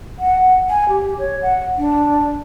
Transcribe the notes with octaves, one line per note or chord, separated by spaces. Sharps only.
F#5
G#5
G4
C#5
F#5
D4